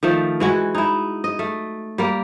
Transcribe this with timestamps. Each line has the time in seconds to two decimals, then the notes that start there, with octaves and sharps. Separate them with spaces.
0.03 D#3 F3 A3
0.40 E3 G#3 F#4
0.75 D#4 E4
1.24 D#5
1.39 A3
1.98 G3 A#3